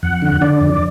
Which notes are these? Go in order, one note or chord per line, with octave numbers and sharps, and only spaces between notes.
F2 F#5
D3
D3 D5
F2